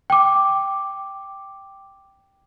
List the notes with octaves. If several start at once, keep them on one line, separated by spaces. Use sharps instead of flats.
G5 D6